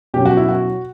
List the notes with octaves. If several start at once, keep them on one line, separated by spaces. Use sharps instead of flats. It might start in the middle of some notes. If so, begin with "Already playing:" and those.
B2 F#3 C#4 G4
F#4
E4
F#4